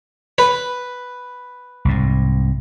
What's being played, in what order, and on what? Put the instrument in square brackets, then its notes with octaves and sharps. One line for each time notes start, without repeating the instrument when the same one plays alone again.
[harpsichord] B4
[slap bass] C2 G#2